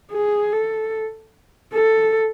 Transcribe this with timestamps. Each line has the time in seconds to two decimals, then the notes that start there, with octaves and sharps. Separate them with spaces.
0.12 G#4
0.53 A4
1.74 A4